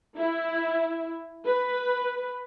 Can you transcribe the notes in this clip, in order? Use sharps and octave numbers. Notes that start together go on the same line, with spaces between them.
E4
B4